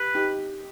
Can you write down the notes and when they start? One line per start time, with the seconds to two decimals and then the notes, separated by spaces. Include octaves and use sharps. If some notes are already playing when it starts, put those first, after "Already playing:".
Already playing: G4 B4
0.15 D#4 G4